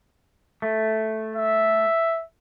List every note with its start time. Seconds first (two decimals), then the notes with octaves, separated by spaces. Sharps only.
0.62 A3
1.36 E5